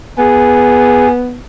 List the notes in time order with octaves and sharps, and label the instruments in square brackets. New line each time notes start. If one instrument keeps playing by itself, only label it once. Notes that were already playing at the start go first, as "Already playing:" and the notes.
[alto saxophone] B3 [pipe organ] G#4